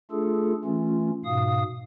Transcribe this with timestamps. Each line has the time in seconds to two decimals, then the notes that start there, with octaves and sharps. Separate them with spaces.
0.11 A3 D4 F4 G#4 A4
0.65 E3 A3 C#4 F4
1.25 G#2 B2 F5 D#6